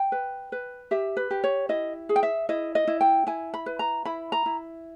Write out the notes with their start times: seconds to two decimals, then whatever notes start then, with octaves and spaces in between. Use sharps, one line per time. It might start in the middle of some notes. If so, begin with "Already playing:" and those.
Already playing: G5
0.12 B4
0.52 B4
0.91 G4 E5
1.17 B4
1.31 G4
1.44 C#5
1.69 E4 D#5
2.09 G#4
2.16 G5
2.23 E5
2.49 E4 D#5
2.75 D#5
2.87 E4
3.01 G5
3.27 E4 G#5
3.54 B5
3.66 B4
3.79 A#5
4.05 E4 B5
4.32 A#5
4.46 E4